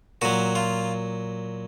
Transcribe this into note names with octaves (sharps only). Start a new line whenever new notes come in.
A#2 F#3 F#4
F4